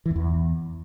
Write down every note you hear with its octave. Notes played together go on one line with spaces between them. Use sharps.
E3
F2
E2